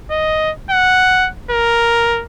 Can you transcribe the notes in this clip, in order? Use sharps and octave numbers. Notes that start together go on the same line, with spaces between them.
D#5
F#5
A#4